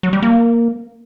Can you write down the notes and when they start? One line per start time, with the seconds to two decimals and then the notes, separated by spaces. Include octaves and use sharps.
0.03 F#3
0.13 G3
0.22 A#3